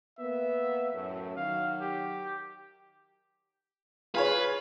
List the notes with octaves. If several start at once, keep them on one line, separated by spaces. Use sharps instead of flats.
A#3 B3 B4 E5
F#2 A2
D#3 F#3 F5
G4
F4 G#4 B4 C#5